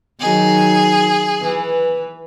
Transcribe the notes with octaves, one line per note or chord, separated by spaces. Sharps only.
D#3 F#3 D#4 G#4
E3 B4